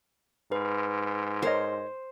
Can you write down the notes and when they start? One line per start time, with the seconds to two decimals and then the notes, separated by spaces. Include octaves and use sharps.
0.52 G#2 B4
1.42 A#4 C5 C#5 D#5